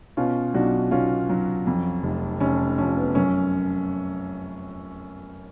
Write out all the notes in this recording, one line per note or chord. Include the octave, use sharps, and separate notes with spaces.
B2 C#4 F4
B1 D4 F#4
B1 C#4 F4
F#3
F2
F1
F1 C#4
F3 C#4
B3
F#2 C#4